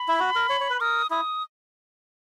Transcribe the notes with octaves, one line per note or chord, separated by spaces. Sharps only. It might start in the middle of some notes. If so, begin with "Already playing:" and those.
Already playing: B5
E4
F#4
A#4
C#5
C#5
B4
A#4 D#6
E4 D#6